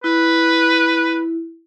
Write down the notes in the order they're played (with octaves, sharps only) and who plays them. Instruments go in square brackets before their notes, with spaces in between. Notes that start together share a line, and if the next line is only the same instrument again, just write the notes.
[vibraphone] E4 [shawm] B4